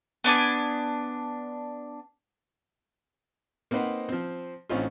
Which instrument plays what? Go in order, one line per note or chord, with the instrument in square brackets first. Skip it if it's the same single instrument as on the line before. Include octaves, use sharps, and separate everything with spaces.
[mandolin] B3 D4 D5 G#5
[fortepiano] A#3 C4 D#4 B4 C5 F#5
F3 C4
A1 C4 C#4 D#4 F4